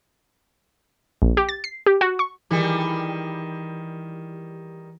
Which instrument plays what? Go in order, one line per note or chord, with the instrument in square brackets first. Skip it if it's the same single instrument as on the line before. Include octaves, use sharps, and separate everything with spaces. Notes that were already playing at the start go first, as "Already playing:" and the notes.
[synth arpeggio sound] A#1
G4
A6
C7
G4
F#4
C#6
[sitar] D#3 G3 [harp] E3 G#4